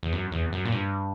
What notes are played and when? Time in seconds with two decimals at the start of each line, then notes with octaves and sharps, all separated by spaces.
0.03 E2
0.13 F#2
0.32 E2
0.53 F#2
0.65 A#2
0.72 G2